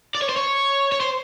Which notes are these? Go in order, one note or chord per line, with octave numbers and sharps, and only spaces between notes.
D5
C#5
C5
C#5
C#5
C5